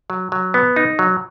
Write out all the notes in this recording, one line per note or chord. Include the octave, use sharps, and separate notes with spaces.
F#3
F#3
B3
D#4
F#3